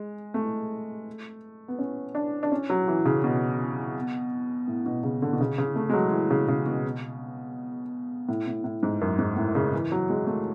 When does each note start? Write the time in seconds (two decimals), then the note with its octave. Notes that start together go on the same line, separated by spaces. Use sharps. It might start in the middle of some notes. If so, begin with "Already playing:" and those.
Already playing: G#3
0.34 A3
1.68 B3
1.79 C#4
2.15 D4
2.43 D4
2.52 C#4
2.70 F#3
2.88 E3
3.05 C#3
3.24 B2
4.68 A2
4.86 B2
5.03 C#3
5.22 D3
5.33 B2
5.41 C#3
5.58 C#3
5.76 A3
5.90 G#3
5.94 F#3
6.12 E3
6.31 C#3
6.48 C#3
6.66 B2
8.29 A2
8.47 A2
8.64 A2
8.83 G#2
9.01 F#2
9.19 G#2
9.36 A2
9.55 C#3
9.73 E3
9.92 F#3
10.10 G#3
10.27 A3